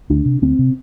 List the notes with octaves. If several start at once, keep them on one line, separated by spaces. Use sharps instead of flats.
D2 D4
C3
D2 C4
C3